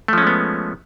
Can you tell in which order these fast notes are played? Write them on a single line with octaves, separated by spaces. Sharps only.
A3 F3 C#4 G#3 B3